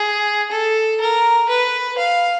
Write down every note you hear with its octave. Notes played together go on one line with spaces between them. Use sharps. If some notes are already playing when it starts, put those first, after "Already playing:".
Already playing: G#4
A4
A#4
B4
F5